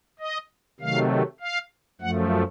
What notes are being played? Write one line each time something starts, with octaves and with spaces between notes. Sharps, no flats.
D#5
C3 D#3 F#3 A3 F5
F5
F#2 F3 A3 F#5